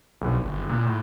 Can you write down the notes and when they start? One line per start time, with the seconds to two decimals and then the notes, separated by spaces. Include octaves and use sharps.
0.21 B1
0.41 G1
0.69 A#2
0.86 A2